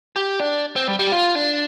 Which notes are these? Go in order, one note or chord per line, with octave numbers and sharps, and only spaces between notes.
G4
D4
C4
G3
G3
G4
F4
D4